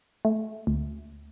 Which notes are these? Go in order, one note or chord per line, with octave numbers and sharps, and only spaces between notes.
A3
D2